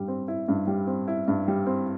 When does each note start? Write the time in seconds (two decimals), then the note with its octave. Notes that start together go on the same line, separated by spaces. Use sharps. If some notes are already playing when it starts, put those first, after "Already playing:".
Already playing: G2 G3
0.08 C4
0.28 E4
0.48 G2
0.67 G3
0.87 C4
1.08 E4
1.28 G2
1.48 G3
1.67 C4